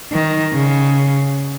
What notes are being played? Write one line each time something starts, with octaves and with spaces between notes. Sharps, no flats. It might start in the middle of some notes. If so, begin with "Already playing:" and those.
D#3
C#3